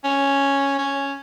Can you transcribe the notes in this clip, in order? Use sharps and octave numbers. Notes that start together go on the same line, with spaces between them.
C#4
C#4